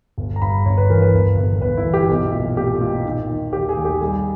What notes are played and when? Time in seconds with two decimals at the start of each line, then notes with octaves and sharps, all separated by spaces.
0.18 G1
0.36 A#5
0.42 G2 B5
0.66 G1 C#5
0.78 B4
0.90 E3 A#4
1.02 B4
1.14 G1
1.37 G1
1.61 G1 B4
1.77 E4
1.85 E3
1.94 G4
2.09 B1
2.33 A#2
2.57 A#2 G4
2.81 A#2
3.05 D#3
3.29 D#2
3.53 D#2 G4
3.69 G#4
3.77 D#2
3.85 G4
4.01 G3 G#4